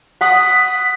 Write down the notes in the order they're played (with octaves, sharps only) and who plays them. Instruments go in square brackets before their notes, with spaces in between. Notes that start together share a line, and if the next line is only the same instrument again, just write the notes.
[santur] F#5 D#6 [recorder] B6